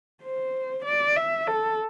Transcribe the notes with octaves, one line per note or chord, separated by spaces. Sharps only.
C5
D5
E5
A4